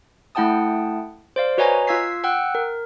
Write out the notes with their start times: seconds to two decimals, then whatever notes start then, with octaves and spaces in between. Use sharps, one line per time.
0.35 A3 E4 F#5 G5 A5 D#6
1.36 C5 D5 F5
1.58 F#4 B4 C#5 D#5 G#5 A#5
1.87 F4 F5 E6 G#6 B6 C7
2.24 F#5 G5 E6 F#6
2.55 A#4